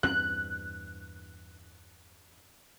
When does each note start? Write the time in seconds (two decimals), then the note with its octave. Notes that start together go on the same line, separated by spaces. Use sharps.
0.03 E2 G2 C4 F#6